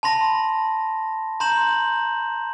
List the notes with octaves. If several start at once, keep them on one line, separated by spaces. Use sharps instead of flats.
A5 B5 C6 A#6
A#5 C6 G6 E7 F#7